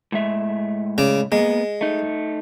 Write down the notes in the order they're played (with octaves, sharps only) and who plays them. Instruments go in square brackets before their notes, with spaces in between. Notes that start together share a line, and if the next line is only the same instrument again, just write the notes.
[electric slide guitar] A2 G#3 E5
[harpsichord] C#3 D5
[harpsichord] G#3 [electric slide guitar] A#3 B3
[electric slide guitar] A3 D#4